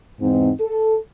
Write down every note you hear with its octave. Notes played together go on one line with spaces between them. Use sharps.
E2 G#2 C4 D#4
A4